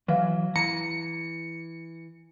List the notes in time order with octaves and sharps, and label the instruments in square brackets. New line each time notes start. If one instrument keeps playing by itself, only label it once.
[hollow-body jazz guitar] E3 [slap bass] F#3 [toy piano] B4 E5 F5
[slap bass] E3 [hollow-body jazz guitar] A#5 [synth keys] C#7